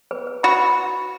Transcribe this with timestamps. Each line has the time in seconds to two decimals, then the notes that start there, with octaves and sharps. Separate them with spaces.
0.11 B4
0.27 B4
0.43 F#4 B5